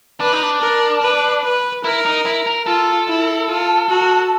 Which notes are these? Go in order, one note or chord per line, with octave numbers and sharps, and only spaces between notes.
D4 B4
D#4
D4
A#4
B4
B4
E4 A#4
D#4
E4
A#4
F4 A4
E4
F4
F#4